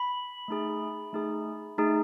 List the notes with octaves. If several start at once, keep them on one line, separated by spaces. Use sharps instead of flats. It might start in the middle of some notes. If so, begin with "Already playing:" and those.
Already playing: B5
A3 D#4 G#4
A3 D#4 G#4
A3 D#4 G#4